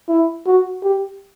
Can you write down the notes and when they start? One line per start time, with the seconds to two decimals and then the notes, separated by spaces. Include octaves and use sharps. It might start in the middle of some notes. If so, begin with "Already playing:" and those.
0.09 E4
0.47 F#4
0.83 G4